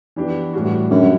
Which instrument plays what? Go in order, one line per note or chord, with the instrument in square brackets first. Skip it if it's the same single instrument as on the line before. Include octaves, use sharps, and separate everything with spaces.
[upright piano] E3 B3 D4 G4
A2 E3 G3 D4 F#4
[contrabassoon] F#2 [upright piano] D3 G3 D4